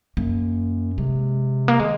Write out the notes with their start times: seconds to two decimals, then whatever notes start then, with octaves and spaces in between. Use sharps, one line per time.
0.17 F#2 A#3
0.98 C3 G#3
1.68 A#3
1.79 D#3 G#3